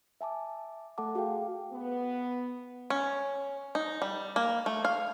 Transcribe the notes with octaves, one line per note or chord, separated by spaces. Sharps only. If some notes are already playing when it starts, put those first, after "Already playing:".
E5 G#5 A5 D6
A3 A4 F#5 A5 D6
F#4 G#4 F5 G5
B3
C#4
D#4
G3
A#3
A3
F5